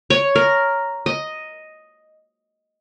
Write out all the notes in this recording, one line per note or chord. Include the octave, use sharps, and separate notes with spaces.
C#5
A#4
D#5